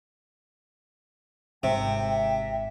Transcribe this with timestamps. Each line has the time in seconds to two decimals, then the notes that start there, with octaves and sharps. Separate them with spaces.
1.63 G#1 C3 E5 G5